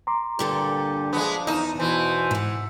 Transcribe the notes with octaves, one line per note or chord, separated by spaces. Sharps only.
A#5 C6 D6
G2 A#2 D3 G4 A4
F3 G#3 B3 D4
E2 D#4 A5
B2 E3 C5 G#5
G#2 C3 F#5